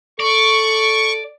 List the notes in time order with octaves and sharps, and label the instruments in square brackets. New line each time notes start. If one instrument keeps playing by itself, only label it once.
[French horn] A4 [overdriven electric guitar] D5 [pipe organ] C#6